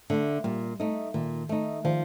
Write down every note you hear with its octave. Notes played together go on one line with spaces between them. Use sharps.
D3 A3
A#2 G3
A3 D#4
A#2 D#3
A3 D#4
D#3 F3